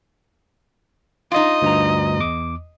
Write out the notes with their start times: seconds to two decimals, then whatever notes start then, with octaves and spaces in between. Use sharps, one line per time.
1.32 D#4 F4 D#5
1.62 D2 G2 A#5
2.19 E2 D6